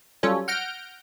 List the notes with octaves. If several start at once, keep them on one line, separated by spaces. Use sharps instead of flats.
F#3 G3 C#4 F4 A4 C#5
F#5 F6 G6 A#6 D7